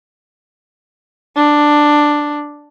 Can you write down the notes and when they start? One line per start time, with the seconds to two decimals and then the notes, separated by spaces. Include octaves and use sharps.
1.36 D4